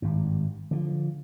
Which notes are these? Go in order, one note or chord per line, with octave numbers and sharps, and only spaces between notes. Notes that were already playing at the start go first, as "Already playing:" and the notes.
G#1 G2
D3 E3 F3